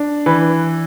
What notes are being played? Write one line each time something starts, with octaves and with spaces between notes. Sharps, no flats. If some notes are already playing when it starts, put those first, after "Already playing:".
Already playing: D4
E3 B4